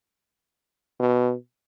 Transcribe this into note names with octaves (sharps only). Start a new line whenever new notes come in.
B2